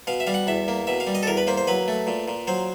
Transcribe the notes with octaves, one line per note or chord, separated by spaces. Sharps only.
B2 F5
E5
G3 F5
F#5
E2 E5
A#3
B2 E5
F5
G3
D#5
A4
E2 A#4
B4
A#3 C5
C5
F#3 B4
A3
A#2
A#2
F#3 C5